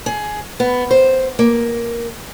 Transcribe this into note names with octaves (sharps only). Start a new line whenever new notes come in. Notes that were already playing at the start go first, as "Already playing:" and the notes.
G#4
B3
C5
A#3